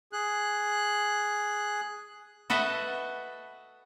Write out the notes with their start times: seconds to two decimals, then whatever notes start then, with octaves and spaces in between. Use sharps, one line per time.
0.13 G#4 F#6
2.50 F#4 A4 B4 D#5 E5